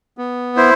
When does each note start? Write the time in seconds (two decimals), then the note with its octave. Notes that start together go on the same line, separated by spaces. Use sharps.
0.18 B3
0.56 E4 C5